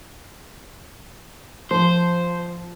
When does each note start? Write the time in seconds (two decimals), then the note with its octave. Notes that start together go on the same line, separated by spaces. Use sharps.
1.71 F3 C5